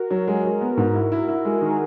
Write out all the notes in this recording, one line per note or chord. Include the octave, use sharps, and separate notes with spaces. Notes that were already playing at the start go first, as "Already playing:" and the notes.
Already playing: F#4 A#4
F#3
G#3
G#3
B3
G#2
E4
E4
E4
G#3
G#4
D#3 F#4 A#4